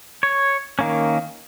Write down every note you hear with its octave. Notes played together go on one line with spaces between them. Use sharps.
C#5
D#3 A#3 C#4